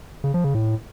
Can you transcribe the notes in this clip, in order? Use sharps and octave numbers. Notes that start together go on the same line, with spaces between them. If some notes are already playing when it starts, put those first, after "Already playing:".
C#3
F3
C#3
A2